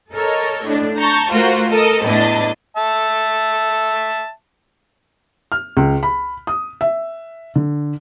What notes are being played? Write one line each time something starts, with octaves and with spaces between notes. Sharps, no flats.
A4 A#4 C#5 D#5
A2 D4
A5 A#5 C#6 G6
A3 F4 F#4 A#4 C5
A4 A#4 D#5 D#6
E2 A2 D4 E4 D#5 A6
E5 A5
F6
C#2
B5
D#6
E5
D3